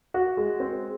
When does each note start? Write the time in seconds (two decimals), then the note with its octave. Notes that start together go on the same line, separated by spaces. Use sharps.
0.14 F#4
0.37 G#3
0.60 C4